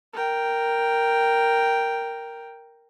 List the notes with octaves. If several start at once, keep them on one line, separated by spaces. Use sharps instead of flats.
A#4 G5